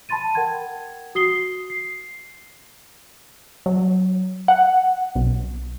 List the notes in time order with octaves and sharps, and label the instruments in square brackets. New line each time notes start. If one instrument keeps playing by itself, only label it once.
[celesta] A5 B5 C6 A6 D#7
A#4 F#5 G5 G#6
F#4 D#6 C7 G7
C7
[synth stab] F#3
F#5
B1